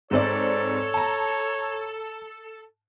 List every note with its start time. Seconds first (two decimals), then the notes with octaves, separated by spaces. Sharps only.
0.11 G#2 C4 A4 C#5 D5
0.94 A5 A#5